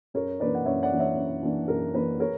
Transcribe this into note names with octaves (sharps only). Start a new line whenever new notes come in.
F#2 A#4 C#5
E3 A#3 D4 B4 D5
F#5
F#2 C#5 E5
D5 F#5
E3 A#3 D4
C#5 E5
F#2
E3 A#3 D4
F#2 A#4
E3 A#3 D4 B4
A#4 C#5